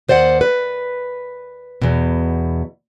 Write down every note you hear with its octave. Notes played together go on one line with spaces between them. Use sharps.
D#2 C5 D5 F5 F#5
B4
E2 B2